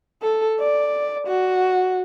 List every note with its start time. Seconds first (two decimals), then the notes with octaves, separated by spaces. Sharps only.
0.22 A4
0.59 D5
1.27 F#4